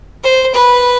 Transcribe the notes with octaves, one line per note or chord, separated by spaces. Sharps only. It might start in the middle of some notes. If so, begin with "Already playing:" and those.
C5
B4